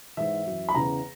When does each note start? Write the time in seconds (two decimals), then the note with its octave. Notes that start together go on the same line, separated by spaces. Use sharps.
0.17 G#2 E3 E5
0.46 F#2 E3
0.69 B5
0.75 E2 C#3 E3 A#5